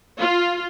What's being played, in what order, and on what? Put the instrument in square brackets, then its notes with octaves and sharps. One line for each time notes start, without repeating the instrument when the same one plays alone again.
[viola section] F4